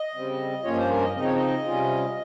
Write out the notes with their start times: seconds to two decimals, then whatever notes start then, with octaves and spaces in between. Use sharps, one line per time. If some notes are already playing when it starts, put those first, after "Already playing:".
Already playing: D#5
0.14 C#3 G3 C4
0.64 G2 F3 A#3 C#4 F4 C#5
0.76 C5
0.90 A#4
1.02 D#5
1.14 C#3 F3 C4 D#4 D#5
1.24 C#5
1.34 D#5
1.65 C3 G3 C#4 F4